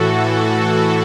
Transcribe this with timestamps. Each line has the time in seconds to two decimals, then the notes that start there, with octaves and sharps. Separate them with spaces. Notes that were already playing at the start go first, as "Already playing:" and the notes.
Already playing: A2 E3 F#4 A4